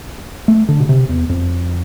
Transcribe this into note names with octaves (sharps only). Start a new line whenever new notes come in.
A3
D3
B2
C3
E2
F2